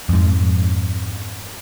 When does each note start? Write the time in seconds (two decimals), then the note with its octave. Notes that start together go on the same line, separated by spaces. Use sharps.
0.09 F2 G#2